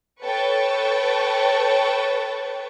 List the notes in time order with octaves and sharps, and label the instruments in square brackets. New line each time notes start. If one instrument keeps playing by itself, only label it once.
[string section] A4 B4 C#5 G5 A5 C#6